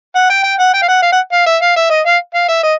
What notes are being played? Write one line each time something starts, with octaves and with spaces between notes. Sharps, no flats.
F#5
G5
G5
F#5
G5
F5
F#5
F5
F#5
F5
E5
F5
E5
D#5
F5
F5
E5
D#5